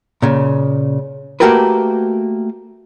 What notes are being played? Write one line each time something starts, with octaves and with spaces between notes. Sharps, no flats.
A#2 C#3
A3 A#3 F#4 G4 A#4 B4